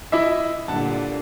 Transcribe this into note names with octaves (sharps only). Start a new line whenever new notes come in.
E4 D#5 E5
G2 A#2 D3 F#5 A5